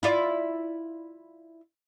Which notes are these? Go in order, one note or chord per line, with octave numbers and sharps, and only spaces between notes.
E4 F4 D5